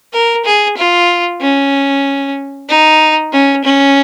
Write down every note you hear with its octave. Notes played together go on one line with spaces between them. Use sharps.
A#4
G#4
F4
C#4
D#4
C#4
C#4